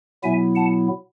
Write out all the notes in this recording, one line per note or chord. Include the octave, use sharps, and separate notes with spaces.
B2 F#3 B3 E4 E5 G#5
F#5 A5